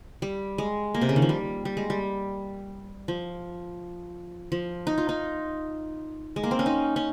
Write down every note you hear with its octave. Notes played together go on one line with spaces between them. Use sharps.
G3
G#3
A#3
C3
C#3
D#3
F3
G3
G3
G#3
G3
F3
F3
D#4
F4
D#4
G#3
A#3
C4
C#4
D#4
C#4